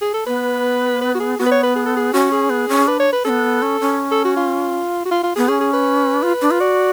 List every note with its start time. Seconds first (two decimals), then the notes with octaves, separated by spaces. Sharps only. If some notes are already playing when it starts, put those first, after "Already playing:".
0.02 G#4
0.14 A4
0.27 B3 B4
1.01 B4
1.15 F#4
1.20 G#4
1.39 B3 F#4
1.46 B4
1.52 C#5
1.63 B4
1.76 G#4
1.86 A4
1.96 G#4
2.13 C#4 F#4
2.32 G#4
2.50 B3
2.69 C#4
2.88 D4 B4
3.00 C#5
3.13 B4
3.25 C#4 A4
3.29 B3
3.62 C#4
3.81 C#4
4.12 A4
4.25 F#4
4.37 F4
5.05 F#4
5.11 F4
5.23 F4
5.36 B3 G#4
5.48 C#4 G#4
5.61 G#4
5.73 B4
6.23 F4
6.42 D4
6.51 F4
6.60 F#4 D5